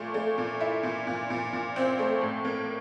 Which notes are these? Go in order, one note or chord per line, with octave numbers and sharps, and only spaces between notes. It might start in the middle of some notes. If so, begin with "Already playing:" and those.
Already playing: A#2 A3
A3
A#2
E4
A#2
A#2
A#2
A#2
C4
A3
A2
A#3